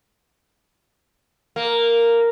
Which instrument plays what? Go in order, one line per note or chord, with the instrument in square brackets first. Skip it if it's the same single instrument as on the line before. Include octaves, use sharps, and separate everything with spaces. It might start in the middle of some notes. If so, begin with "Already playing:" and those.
[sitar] A#3